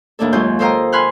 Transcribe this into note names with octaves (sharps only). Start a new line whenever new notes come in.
D#2 A2 A#3 D4 A4
F#2 G#3 C#4 F4 G6
A4 C5 D#5 F5 G5 A#5
G#5 B5 C6 F6 F#6